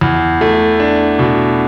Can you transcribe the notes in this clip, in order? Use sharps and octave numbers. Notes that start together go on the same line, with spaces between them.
E2
A3
D4
B2